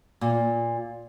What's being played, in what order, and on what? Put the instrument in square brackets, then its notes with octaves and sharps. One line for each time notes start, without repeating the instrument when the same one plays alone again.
[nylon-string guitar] A#2